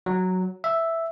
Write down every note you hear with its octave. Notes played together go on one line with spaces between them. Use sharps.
F#3
E5